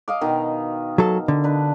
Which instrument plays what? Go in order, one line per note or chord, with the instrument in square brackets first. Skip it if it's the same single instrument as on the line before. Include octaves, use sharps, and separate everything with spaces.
[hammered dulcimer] D#5 F5 D6
B2 D#3
[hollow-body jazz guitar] F#3 A4
D3
[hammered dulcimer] D4 B4